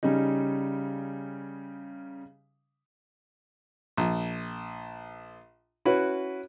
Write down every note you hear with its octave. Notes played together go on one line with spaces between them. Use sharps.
C#3 G3 C#4 D#4
A#1
C#4 E4 F#4 B4